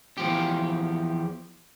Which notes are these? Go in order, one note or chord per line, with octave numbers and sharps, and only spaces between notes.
E2 F3 G4